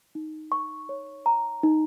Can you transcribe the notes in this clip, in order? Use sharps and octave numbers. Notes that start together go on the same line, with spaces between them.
D#4
C#6
C#5
A#5
D#4